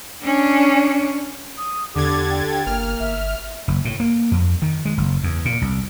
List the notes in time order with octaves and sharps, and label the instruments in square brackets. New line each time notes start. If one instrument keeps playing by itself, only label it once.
[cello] C#4 D4
[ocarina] D#6
[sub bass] E2 [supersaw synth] D3 G#6 A6 [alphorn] G4 [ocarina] D6
[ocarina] G5
[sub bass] G1 [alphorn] A#3 [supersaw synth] F6
[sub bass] G1 [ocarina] E5
[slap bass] F#1
A2
A#3
F2
D#3
G#3
F#1
E2
A#2
C2